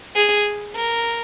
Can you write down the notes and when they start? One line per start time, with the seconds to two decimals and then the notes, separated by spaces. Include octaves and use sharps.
0.16 G#4
0.76 A#4